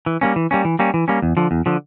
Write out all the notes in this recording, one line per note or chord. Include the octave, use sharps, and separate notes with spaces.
E3
G3 A#3 C#4
E3
G3 A#3 C#4
E3
G3 A#3 C#4
E3
G3 A#3 C#4
E2
D3 F3
E2
D3 F3